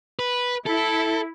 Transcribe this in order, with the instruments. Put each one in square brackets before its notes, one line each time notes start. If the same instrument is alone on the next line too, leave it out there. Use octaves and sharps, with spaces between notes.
[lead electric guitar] B4
[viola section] E4 [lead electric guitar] A4